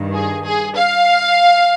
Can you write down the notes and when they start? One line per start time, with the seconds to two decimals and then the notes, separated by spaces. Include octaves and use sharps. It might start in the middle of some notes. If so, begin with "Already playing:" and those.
Already playing: G2 D#3
0.13 G#4
0.44 G#4
0.76 F5